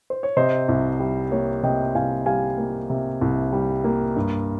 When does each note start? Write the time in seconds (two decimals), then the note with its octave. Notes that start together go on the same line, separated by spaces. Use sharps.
0.10 C5
0.23 C#5
0.37 C3 C5 D#5
0.68 C2
1.00 G3
1.31 A#3 C#5
1.63 C3 D#5 G5
1.95 C2 F5 G#5
2.26 G3 F5 G#5
2.58 A#3
2.90 C3
3.21 C2
3.53 G3
3.84 A#3
4.16 G2